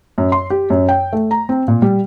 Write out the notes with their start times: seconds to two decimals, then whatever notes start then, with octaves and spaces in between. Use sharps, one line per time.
0.18 F#2
0.32 C6
0.50 G4
0.70 F#2
0.89 G5
1.13 A3
1.31 A#5
1.49 C4
1.68 A#2
1.82 G3